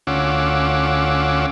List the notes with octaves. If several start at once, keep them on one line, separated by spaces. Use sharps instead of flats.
D2 C#4 F4 F#5 D6 E6